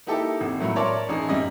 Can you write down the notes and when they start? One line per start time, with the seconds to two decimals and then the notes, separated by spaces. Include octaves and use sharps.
0.07 A#3 D#4 E4 G4 A4
0.41 G#1
0.59 A2 F#3 A3 A#3
0.76 A#4 C#5 D5 E5 A5 C6
1.09 A1 D#4 G#4
1.28 F#2 G3 D#5 E5